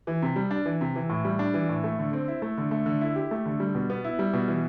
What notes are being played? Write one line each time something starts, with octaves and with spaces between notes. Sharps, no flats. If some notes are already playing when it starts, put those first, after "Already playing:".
E3
C3
G3
D4
E3
C3
E3
A2
G3
D4
E3
A2
A3
D3
C4
E4
A3
D3
A3
D3
E4
G4
A3
D3
G3
B2
B3
E4
G3
B2
E3